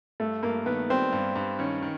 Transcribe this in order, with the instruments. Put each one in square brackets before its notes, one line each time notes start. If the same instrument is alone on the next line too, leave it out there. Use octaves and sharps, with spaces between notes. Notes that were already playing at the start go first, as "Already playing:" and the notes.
[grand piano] G2 [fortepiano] A3
[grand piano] G2 [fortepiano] A#3
[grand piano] D#3 [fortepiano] B3
[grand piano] G3 [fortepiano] C4
[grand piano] G2
G2
[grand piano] D#3 [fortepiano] C#4
[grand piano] D#3